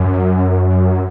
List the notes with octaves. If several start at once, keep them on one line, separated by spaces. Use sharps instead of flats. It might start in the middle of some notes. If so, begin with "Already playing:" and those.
Already playing: F#2